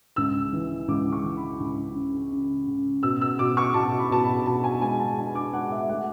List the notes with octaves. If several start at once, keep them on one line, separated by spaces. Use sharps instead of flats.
C#2 E6
E3
C#2 D6
C#6
E3
B5
C#2
C#3
C#3
C#3
B2 E6
E6
B2 D6
C#6
B2 A5
B5
B2 A5
B5
B2 A5
G#5
G#3 G#5
A5
D4 G#5
D6
G#3 F#5
E5
A3 F#5